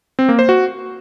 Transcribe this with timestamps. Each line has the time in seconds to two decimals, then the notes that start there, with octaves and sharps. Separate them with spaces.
0.19 C4
0.29 A#3
0.39 C5
0.49 F#4